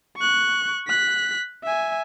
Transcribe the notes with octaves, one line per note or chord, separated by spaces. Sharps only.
C#6 F#6
F#6 B6
E5 G#5